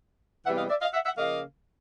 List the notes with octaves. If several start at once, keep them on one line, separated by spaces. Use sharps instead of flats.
E2 C3 E3 G3 B3 E5 F#5
D#5 F5
D5 E5
D#5 F5
E5 F#5
E5 F#5
C#3 F3 A#3 D#5 F5